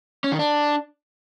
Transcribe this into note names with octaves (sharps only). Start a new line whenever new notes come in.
C#4
D#3
D4